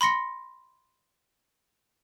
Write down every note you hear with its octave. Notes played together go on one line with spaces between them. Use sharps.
B5 C6 A#6 C#7